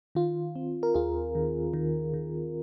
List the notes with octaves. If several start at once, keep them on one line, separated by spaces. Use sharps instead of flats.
D#3 F4
C4
A#4
D#2 F4 G#4
D#3
D#3
D#3